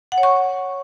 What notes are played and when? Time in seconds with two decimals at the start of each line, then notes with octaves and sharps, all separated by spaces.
0.12 F#5
0.18 C#5
0.23 C#6